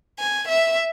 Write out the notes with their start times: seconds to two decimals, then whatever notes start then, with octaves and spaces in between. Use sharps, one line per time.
0.19 G#5
0.48 E5